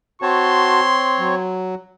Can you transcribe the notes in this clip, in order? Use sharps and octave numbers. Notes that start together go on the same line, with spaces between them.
C4 F#4 C#5 A5 C6
F#3